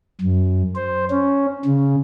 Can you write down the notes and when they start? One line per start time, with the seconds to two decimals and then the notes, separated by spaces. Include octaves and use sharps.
0.21 F#2
0.75 C5
1.10 C#4
1.66 C#3